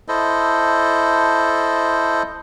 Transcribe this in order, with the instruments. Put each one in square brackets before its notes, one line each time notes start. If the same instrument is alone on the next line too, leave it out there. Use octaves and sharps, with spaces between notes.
[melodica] E4 A4 C5 D#5